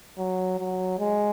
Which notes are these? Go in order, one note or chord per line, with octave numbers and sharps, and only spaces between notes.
F#3
F#3
G#3